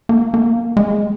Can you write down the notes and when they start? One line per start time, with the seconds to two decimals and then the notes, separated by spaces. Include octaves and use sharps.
0.09 A#3
0.34 A#3
0.77 G#3